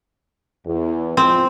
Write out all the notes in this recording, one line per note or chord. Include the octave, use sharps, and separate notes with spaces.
E2
F3 G#3 C4